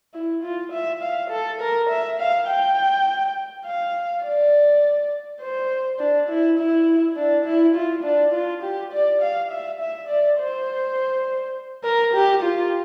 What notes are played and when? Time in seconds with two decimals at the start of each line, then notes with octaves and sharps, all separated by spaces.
0.14 E4
0.43 F4
0.72 E5
1.02 F5
1.30 A4
1.61 A#4
1.89 E5
2.19 F5
2.47 G5
3.65 F5
4.23 D5
5.41 C5
5.99 D4
6.29 E4
6.58 E4
7.16 D4
7.45 E4
7.75 F4
8.03 D4
8.32 F4
8.62 G4
8.92 D5
9.21 F5
9.51 E5
9.80 E5
10.08 D5
10.38 C5
11.84 A#4
12.14 G4
12.42 F4